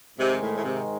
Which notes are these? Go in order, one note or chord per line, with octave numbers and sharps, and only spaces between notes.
G#2 C3 D#3 G#3
A2
A2
C3